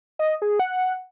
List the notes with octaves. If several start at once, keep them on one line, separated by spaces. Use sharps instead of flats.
D#5
G#4
F#5